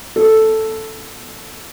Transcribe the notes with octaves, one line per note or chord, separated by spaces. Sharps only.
A4